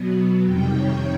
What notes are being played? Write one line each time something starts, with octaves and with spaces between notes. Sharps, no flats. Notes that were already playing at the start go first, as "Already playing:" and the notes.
Already playing: B2 F#3 B3
F2 C3 D#3 G3 G5
C#5